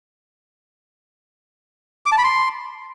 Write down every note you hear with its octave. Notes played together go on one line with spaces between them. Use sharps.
D6
A5
B5
C6